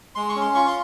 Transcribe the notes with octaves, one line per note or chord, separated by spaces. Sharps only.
G#3 C6
C#6
C#4
C6
F4 C#6
C6